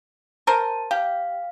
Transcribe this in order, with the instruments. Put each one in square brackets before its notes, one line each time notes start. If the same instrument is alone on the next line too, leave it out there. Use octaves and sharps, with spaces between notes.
[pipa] A#4 C5 [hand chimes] A5
[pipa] G4 [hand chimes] F5